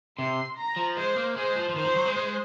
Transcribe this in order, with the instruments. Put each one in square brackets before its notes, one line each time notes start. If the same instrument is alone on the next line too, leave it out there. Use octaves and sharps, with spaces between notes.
[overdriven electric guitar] C3 [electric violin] C6
[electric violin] A#5
[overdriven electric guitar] F3
[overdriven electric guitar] G#3 [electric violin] C5
[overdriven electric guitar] A#3
[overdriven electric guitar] G#3 [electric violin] C5
[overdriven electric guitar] F3
F3
[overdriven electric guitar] D#3 [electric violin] C5
[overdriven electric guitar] F3
F#3
G#3
G#3